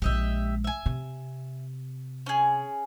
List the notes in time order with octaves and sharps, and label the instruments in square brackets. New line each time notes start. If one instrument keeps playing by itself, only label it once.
[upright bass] A#1 G#3 [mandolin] G4 D#5 E5
[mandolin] E5 G#5
[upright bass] C3
[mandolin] C#4 G#4